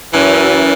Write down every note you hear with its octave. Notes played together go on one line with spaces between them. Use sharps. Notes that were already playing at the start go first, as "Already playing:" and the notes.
F#2 E3